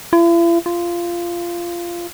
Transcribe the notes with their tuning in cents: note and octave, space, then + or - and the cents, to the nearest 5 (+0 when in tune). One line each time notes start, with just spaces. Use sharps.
E4 +45
F4 -15